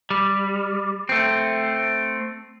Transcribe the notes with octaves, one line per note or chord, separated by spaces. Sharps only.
G3
A3 C4